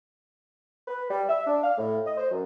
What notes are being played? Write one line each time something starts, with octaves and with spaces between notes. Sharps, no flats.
B4
G3
E5
D4
F5
A2
D#5
C5
F#2